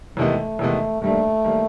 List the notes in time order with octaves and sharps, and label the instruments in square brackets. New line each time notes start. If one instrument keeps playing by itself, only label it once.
[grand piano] E2 C3 D#3 G#3 B3 [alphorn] A3
[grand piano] E2 C3 D#3 G#3 B3
[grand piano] G2 D#3 G3 A#3 [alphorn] A3
[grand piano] D#3 G3 A#3